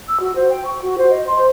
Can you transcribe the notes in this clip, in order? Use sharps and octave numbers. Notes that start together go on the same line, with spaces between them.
E6
F#4
C5
G5
C#6
F#4
C5
D#5
C6
C5